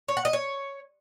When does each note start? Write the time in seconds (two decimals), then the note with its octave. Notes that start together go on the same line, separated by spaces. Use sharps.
0.08 C#5
0.17 F#5
0.25 D#5
0.33 C#5